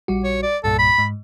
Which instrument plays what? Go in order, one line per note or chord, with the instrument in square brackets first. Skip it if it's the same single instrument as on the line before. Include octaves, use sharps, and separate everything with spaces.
[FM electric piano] A#1 G3 F#4
[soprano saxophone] C#5
D5
[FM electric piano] C2 G2 A#2 [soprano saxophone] A4
[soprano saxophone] B5
[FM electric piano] G#2